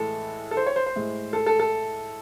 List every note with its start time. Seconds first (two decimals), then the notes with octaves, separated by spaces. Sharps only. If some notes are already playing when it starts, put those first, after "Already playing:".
Already playing: A2 E3 G#3 A4
0.51 A4
0.57 C5
0.66 C#5
0.76 C5
0.86 C5
0.96 A2 G#3
1.33 A4
1.46 A4
1.60 A4